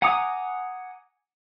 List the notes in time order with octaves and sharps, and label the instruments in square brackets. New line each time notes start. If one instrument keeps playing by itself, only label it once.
[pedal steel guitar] F#5 G#5 A#5 D6 D#6